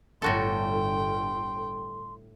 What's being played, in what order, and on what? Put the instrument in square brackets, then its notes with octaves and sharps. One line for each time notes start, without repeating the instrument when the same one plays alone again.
[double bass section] G1 [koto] A2 F#4 A4 [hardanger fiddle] G5 [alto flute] C6